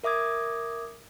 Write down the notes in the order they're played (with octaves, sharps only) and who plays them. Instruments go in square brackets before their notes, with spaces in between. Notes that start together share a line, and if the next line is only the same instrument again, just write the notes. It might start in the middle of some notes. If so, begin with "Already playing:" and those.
[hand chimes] A#4 E5 D6 D#6 G#6